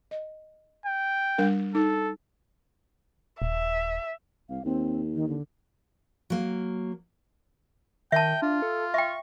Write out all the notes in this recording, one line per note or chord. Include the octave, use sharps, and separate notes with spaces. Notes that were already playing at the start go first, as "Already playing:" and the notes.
D#5
G5
G3 D4 A#4
D#4 A4
D#1 E5
C2 F5
D#2 C4
D#3
D3
F#3 A#3
D#3 E5 G5 A5
D4 F4
A4
E5 G5 C#6